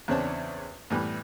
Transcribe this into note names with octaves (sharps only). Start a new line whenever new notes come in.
E2 C#3 C4 D4 C#5 A5
A2 E3 G3 B3 G4